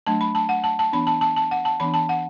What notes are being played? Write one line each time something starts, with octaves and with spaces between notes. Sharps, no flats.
F#3 A3 D4 A5
B5
A5
F#5
A5
A5
E3 B3 D4 B5
A5
A5
A5
F#5
A5
E3 B3 D4 B5
A5
F#5